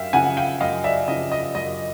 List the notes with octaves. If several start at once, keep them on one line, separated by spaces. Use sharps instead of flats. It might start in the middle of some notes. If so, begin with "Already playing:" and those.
Already playing: F#2 E5 F5 G5
C#3 F3 F#5 G#5
F5 G5
F#2 D#5 F5
D5 E5
C#3 F3 D#5
D#5
F#2 D#5